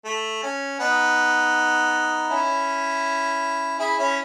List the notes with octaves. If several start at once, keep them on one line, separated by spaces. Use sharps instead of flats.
A3
C#4
B3 D#4
C#4 E4
E4 G#4
C#4 E4